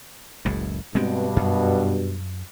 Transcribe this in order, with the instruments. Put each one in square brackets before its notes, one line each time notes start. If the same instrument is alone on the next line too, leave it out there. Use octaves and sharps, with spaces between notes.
[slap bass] F#1 C#2 A2
[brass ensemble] G2 B2 [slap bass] G#3 B3 C4
[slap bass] F#2